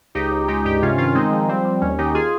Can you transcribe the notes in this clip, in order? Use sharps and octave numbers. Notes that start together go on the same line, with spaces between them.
C#2 D#4 G4
C#2
G#3 D#4 G4
G2 D#4 G4
C3 C#4 F4
D#3 C#4 F4
G#3 C4 D#4
F3
G3 C4
G3
D#2 C#4
D#3 D#4 G4
F4 G#4